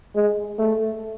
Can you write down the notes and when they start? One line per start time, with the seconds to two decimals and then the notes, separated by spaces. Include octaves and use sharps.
0.15 G#3
0.59 A3